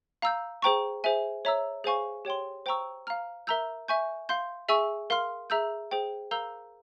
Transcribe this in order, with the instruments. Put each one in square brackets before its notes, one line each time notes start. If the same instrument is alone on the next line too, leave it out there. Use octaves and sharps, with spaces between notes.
[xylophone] F5 A#5 E6 G6
G#4 C5 G5 A#5 C#6
G#4 C5 E5 G#5
C#5 E5 A#5 E6
G#4 C5 F5 G#5 C#6
G4 C#5 G5 C6
C5 G5 A#5 C#6 E6
F5 A#5 F6
A#4 E5 A#5 E6 G6
E5 G#5 C#6 G6
F5 C6 G6
G#4 E5 G#5 C#6 E6
A#4 F5 C6 F6
G#4 E5 A#5 E6 G6
G#4 C5 G5
A#4 F5 A#5 E6 G6